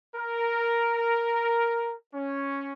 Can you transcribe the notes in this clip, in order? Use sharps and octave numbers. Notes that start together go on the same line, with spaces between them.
A#4
C#4